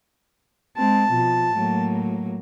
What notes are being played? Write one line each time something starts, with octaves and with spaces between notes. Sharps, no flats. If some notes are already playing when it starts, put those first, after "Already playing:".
G#3 C4 A5
B2 F3
A2 F#3 A#3